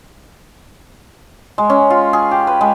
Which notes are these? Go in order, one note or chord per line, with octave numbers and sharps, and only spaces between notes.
G#3
C#4
F4
G#4
G4
B4
G#3